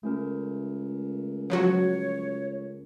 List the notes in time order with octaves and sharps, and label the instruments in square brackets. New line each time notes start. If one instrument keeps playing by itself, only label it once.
[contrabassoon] C#2 [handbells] A3 C#4 A#4
[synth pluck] F3 F#3 F#4 [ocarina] C#5